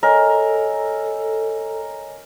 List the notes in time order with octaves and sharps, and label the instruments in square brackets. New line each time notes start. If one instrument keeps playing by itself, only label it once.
[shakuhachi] A4 [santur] A#4 [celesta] C#5 D#5 G#5